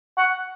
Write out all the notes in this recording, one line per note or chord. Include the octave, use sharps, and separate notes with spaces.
F#5